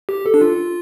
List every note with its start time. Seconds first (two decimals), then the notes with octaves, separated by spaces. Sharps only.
0.09 G4
0.26 A4
0.34 D4
0.41 F4